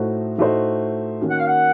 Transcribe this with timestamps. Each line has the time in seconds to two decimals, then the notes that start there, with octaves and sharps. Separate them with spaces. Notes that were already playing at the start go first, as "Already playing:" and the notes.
Already playing: A2 A3 D#4 F#4 C5
0.38 A2 A3 D#4 F#4 C5
1.21 D#3 A#3 C#4 F#4
1.30 F#5
1.39 F5
1.47 F#5